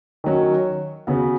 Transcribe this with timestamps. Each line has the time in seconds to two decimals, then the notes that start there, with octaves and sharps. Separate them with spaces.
0.24 D#3 F#3 C#4
1.07 C#3 B3 F#4